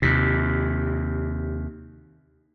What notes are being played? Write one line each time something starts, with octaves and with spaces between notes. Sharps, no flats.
D#2 C3